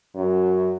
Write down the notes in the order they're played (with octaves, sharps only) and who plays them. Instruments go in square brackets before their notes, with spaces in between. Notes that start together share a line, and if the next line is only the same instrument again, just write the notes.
[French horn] F#2